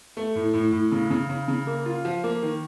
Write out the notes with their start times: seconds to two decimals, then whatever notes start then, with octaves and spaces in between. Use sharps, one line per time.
0.17 A3
0.35 A2
0.54 A2
0.72 A2
0.92 C#3
1.10 C#3
1.29 C#3
1.48 C#3
1.67 A#3
1.86 F4
2.05 F3
2.24 A#3
2.43 D#3